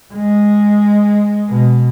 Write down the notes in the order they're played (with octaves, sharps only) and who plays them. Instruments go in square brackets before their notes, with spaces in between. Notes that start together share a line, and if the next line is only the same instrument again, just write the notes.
[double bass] G#3
B2